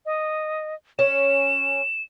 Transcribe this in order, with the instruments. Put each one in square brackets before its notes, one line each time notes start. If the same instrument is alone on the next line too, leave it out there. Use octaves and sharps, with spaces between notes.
[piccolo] D#5
[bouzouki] C#4 [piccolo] E7